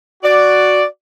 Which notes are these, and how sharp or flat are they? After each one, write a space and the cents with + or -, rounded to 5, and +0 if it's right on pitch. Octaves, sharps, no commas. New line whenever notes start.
F#4 +0 D5 +0